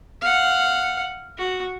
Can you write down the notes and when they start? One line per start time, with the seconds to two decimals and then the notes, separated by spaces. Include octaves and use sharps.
0.21 F5 F#5
1.38 F#4